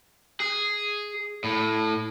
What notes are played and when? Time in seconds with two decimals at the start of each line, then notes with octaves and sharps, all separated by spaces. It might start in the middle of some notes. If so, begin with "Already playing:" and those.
0.40 G#4
1.44 A2